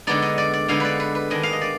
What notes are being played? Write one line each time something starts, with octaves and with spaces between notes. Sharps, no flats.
D3 G#3 B3 D#4 D5
D#5
D5
D5
D3 G#3 B3 D#4 F5
B4 D5
B4
B4
D#3 G#3 D4 D#5
F5
D#5
D5